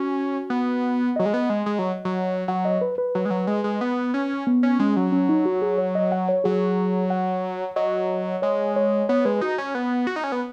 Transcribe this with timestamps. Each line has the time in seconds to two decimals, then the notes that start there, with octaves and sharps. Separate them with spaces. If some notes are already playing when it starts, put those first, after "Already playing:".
Already playing: C#4 F#4
0.50 B3
1.16 F#3 D#5
1.26 G#3
1.34 B3
1.50 G#3
1.66 G#3
1.79 F#3
2.05 F#3
2.48 F#3 F#5
2.65 D#5
2.81 B4
2.98 B4
3.15 F#3
3.25 G#3
3.30 F#3
3.47 G#3
3.64 G#3
3.81 B3
4.14 C#4
4.47 B3
4.63 C#4
4.79 G#3 C#4
4.96 F#3
5.12 C#4
5.29 D#4
5.46 F#4
5.62 G#4
5.78 C#5
5.95 D#5
6.12 F#5
6.29 C#5
6.44 F#3 G#4
7.10 F#5
7.76 F#3 D#5
8.42 G#3 C#5
8.76 C#5
9.09 B3 C#5
9.25 G#3 B4
9.41 D#4 F#4
9.58 C#4
9.75 B3
10.07 F#4
10.16 D#4
10.24 C#4
10.32 B3